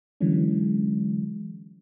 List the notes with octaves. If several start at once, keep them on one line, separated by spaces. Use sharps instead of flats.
D3 E3 F#3 G#3 C#4